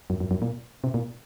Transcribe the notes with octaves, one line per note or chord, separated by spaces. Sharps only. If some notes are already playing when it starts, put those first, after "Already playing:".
F#2
F#2
F#2
A#2
C3
A#2